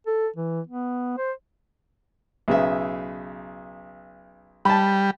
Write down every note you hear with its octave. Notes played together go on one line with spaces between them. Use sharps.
A4
E3
B3
C5
B1 C#3 E5
G3 A5 B5